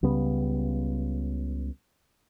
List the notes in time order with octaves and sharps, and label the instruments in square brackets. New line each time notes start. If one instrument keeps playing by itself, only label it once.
[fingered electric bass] C#2 C#3 G3 B3